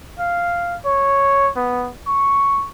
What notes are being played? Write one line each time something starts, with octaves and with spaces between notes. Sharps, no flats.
F5
C#5
B3
C#6